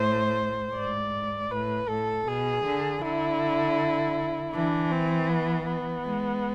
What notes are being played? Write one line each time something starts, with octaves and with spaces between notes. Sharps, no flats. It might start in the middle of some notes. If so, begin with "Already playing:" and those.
Already playing: A2 C5
G#2 D5
A2 B4
A2 A4
B2 G#4
D3
D3 E4
E3 D4
C4
B3
B3
G#3